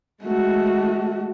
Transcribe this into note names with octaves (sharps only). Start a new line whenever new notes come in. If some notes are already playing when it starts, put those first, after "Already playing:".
G#3 A3 F#4